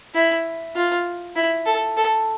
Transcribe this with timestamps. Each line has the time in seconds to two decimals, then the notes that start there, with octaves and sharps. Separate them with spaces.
0.15 E4
0.75 F4
1.36 E4
1.66 A4
1.97 A4